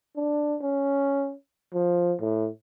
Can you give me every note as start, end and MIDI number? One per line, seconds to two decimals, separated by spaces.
0.17 0.56 62
0.61 1.33 61
1.73 2.14 53
2.21 2.49 45